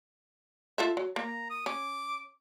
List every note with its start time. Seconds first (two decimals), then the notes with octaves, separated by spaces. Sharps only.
0.78 F4 A4 E5
0.97 F#3
1.16 A#3 A#5
1.50 D#6
1.66 C#4 D6